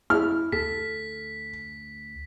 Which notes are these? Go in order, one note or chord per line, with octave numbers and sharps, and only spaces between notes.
E4 F6
D2 A4 B6